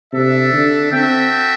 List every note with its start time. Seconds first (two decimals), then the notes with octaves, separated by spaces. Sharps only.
0.13 C3 D4 A4 E5
0.53 D3
0.92 C4 F#4 A4 E5 G5